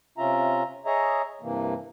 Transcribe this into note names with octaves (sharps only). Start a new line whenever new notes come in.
C3 C#4 F4 E5 A#5
G#4 C#5 D#5 E5 A#5
G2 C3 E3 A#3